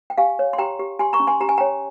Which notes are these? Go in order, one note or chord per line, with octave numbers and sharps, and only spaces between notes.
G5
G4 F5 G#5
C#5
C6
G4 G5 A#5
G4
G4 G#5 C6
A#5 C#6
C#4
G#5 C6
G4 A#5
G#5
C#5 G5 A#5